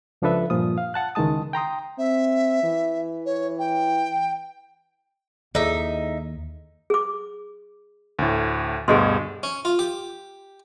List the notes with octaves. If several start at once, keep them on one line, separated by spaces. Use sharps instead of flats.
C#2 F3 D4 A4 B4 E5
G2 A#2 F3 F4 D#6
F5
F#5 A5 F#6
C#2 D#3 E3 G#3 A5 D#6
G5 A#5 C6 D#6
C4 E5
E3
C#5
G5
D#2 D#4 E4 G#4 A4 E5
G#4 D6
D2 A2
D2 G2 B2 G#4 D#5 C6
C#4
F4
G4